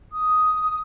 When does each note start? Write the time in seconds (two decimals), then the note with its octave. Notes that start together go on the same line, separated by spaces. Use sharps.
0.12 D#6